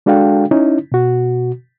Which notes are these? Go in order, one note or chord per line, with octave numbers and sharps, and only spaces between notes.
G#3 D4 F#4 A4 F5 G5
C#4 D#4 E4
B2 F#4